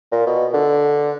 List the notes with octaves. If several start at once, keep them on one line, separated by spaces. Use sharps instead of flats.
A#2
B2
D3